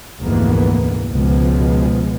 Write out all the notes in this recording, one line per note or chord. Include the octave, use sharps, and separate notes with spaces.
F1 D2 G#2 E3 A#3 B3
C#2 B2 F3 G#3 B3